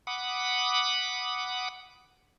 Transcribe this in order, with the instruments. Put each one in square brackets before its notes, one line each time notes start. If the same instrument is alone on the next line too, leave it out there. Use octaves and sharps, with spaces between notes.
[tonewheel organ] F#5 B5 D6 D#6